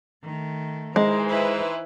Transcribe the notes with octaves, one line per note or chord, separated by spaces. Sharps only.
D#3 A3
E3 G#3 D#4 A#4 C5
E4 B4